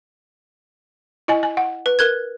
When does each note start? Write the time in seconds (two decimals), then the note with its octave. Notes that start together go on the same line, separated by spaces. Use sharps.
1.28 E4 D#5 G#5
1.43 G#5
1.57 F#5
1.86 B4
1.99 A#4 F#6 G#6